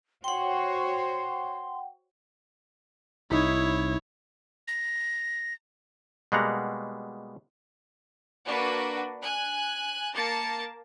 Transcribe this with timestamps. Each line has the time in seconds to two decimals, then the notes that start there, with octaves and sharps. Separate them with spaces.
0.24 F#4 C5 C#5 F#5 G5 C6
3.31 C2 D#4 E4 C#5 B5
4.68 A#6
6.32 B2 G3 G#3 A#3 F#5 A#5
8.45 A#3 D4 F#4 B4
9.22 G#5 F#6
10.13 A#3 A5 A6 C#7